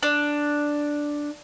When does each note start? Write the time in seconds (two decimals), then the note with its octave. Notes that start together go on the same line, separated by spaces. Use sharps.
0.03 D4